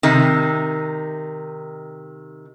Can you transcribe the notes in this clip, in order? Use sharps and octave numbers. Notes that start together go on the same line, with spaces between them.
C3 D#3